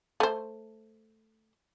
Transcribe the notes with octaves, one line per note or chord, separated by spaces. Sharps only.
A3 C5